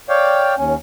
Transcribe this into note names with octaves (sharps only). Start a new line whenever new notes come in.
C#5 D5 F5 G5
D#2 C#4